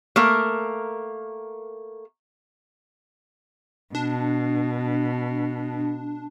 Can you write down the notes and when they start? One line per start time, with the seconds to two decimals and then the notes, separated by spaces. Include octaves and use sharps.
0.16 A3 A#3 A#4
3.95 B2 D4